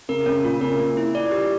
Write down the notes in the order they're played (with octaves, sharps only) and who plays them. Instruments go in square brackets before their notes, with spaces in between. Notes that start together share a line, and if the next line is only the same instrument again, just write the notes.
[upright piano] C#3 [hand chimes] A#4
[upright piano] C#3 [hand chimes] C#4
[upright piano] A#2 [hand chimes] F4
[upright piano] C#3 [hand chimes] A#4
[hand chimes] A#3
E4
D5
G4